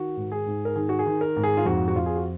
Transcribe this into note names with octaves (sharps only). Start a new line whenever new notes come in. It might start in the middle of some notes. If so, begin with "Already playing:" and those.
Already playing: D#3 F#4
G#2
G#4
G#2
A#4
D#3 G#4
F#4
G#4
D#3
A#4
G#2
G#4
F4
F2 F#4
F#4
F2 F4
G#4
F#4